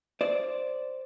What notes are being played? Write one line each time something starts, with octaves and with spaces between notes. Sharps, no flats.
C5 D5